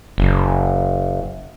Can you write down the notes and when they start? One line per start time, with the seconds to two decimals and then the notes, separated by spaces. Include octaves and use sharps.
0.18 F#1